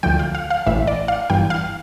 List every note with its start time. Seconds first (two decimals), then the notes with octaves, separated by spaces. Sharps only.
0.03 D2 D3 F3 G5
0.19 F5
0.35 F5
0.50 F5
0.66 A1 A2 E3 E5
0.87 D5
1.08 F5
1.30 G1 G2 E3 G5
1.50 F5